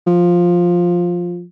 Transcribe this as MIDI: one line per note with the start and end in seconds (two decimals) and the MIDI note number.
0.07 1.44 53